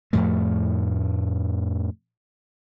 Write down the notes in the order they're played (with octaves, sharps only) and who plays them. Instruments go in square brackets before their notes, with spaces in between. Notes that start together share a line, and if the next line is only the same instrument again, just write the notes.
[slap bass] F2 A2 F3 A3